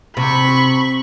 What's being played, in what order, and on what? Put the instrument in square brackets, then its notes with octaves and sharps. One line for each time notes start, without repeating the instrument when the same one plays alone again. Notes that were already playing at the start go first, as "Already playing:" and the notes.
[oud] C3 [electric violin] B5 C#6